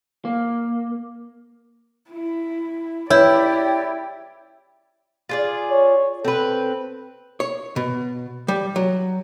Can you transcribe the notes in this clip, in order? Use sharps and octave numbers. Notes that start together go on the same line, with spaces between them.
A#3
E4
E4 G4 C#5 D5
F4 G#4 D5
C#5
C4 A4 B4
C#5
B2
G3
F#3